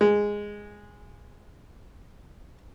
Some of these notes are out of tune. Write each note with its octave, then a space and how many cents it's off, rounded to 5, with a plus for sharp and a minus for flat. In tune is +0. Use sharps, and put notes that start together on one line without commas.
G#3 -10